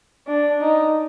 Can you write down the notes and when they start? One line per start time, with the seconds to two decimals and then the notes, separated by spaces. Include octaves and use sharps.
0.27 D4
0.61 D#4